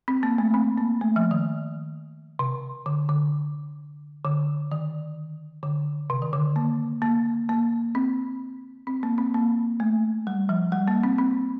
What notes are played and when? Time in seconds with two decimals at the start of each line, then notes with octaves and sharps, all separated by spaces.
0.08 C4
0.23 A#3
0.38 A3
0.54 C4
0.78 A#3
1.01 A3
1.16 F3
1.31 D#3
2.39 C3
2.86 D3
3.09 D3
4.25 D3
4.72 D#3
5.63 D3
6.10 C3
6.22 D#3
6.33 D3
6.56 A#3
7.02 A#3
7.49 A#3
7.95 C4
8.87 C4
9.03 A#3
9.18 C4
9.34 A#3
9.80 A3
10.27 G3
10.49 F3
10.72 G3
10.88 A#3
11.03 C4
11.18 C4